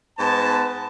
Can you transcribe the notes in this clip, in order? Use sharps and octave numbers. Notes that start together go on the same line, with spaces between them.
G#2 B3 A5